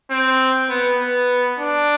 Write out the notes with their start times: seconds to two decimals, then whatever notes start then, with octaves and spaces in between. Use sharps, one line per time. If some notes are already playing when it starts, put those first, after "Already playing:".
0.11 C4
0.69 B3
1.00 B3
1.59 D4